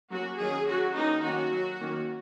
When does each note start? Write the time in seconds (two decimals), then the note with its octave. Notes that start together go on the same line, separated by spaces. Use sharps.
0.11 F#3 A#3 C#4 F#4
0.39 D#3 F#3 A#3 C#4 G#4
0.66 F#3 C#4 F#4
0.95 D#3 A#3 C#4 D#4
1.23 D#3 F#3 A#3 C#4 F#4
1.51 F#3 C#4
1.80 D#3 A#3 C#4